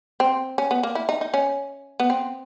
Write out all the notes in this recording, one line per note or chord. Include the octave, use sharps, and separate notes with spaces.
C4
C#4
B3
A#3
E4
D#4
D#4
C#4
B3
C4